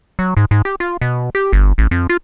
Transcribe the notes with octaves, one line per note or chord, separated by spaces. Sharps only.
F#3
G#2
G#2
G4
F4
B2
G4
G1
A1
F2
F4